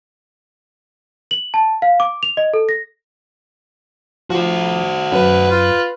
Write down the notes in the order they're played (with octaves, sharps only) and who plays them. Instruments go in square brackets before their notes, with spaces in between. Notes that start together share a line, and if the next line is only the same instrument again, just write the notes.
[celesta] F#7
A5
F5
D6
F7
D#5
A4
A#6
[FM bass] F3 [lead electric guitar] F#4 C5
[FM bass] F#2 [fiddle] B4
[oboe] F4